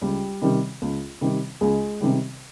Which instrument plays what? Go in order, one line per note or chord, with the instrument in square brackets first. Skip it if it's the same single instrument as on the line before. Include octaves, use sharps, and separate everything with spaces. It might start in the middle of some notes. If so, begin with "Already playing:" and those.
[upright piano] C#2 G3 G4
C3 D#3 G3
C#2
C3 D#3 G3
C#2 G#3 G#4
C3 D#3 G3